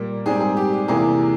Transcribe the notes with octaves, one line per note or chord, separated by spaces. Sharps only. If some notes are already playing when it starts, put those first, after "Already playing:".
Already playing: A#2 G3 A#3 A#4
G#2 G3 C4 G#4
G#4
G4
G4
E2 C3 E3 A#3 G#4